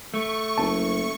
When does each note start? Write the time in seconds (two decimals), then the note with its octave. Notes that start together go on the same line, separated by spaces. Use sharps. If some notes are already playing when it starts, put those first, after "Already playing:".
0.14 A3 C#6
0.58 F#1 A5